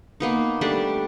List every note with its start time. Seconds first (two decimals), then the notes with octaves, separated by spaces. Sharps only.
0.20 A#3 B3 D#4
0.61 G3 A3 D4 D5